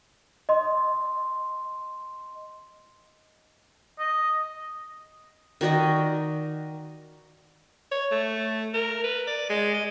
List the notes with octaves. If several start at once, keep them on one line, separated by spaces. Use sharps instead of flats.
D#5 C6
D#5
D#3 F#4 D5 D#5
C#5
A3
A#4
B4
D5
G#3
D#5